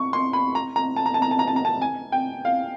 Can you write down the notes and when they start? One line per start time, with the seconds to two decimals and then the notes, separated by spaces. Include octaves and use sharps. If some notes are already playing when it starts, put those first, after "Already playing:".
Already playing: C#6
0.13 C6
0.33 B5
0.55 A#5
0.76 A#5
0.96 A5
1.06 A#5
1.14 A5
1.22 A#5
1.31 A5
1.39 A#5
1.48 A5
1.56 A#5
1.65 A5
1.82 G#5
2.12 G5
2.45 F5